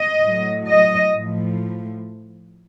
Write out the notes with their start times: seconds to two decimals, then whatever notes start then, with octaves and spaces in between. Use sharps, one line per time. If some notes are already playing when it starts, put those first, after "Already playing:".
Already playing: D#5
0.24 A2 F#3
0.69 D#5
1.15 A2 F3